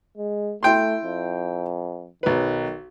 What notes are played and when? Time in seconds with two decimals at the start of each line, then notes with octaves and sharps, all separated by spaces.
0.17 G#3
0.63 A3 E4 G5 C6
1.04 F2
2.23 B1 D#3 B4